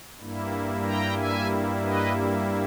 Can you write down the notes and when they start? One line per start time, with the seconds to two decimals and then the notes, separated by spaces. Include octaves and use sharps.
0.20 G2 G3 A#3 E4
0.86 G5 A#5
1.18 E5 G#5
1.83 B4 D#5